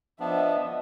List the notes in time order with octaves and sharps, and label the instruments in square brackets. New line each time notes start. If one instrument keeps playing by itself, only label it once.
[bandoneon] F3 B3 D4 [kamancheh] D#5 E5